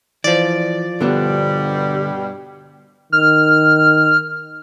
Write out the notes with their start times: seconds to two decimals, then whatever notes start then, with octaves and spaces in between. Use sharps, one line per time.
0.24 E3 F3 D5
1.01 G2 B2 D3 G3 B3 D4
3.12 D#3 F6